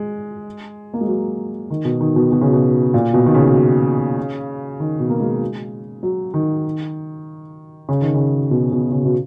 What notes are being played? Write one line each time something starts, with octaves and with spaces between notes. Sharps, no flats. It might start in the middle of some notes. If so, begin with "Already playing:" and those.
Already playing: G#3
A#3
G#3
F#3
D#3
B2
D#3
B2
B2
C#3
B2
A#2
B2
D#3
C#3
D#3
B2
A#3
G#3
F#3
D#3
C#3
D#3
C#3
B2
B2
C#3
B2